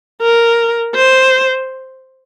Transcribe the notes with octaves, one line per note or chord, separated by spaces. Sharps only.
A#4
C5